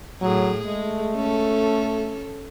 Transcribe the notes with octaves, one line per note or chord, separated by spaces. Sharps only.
A2 F#3 G#4
G#3 A3
C#4 A4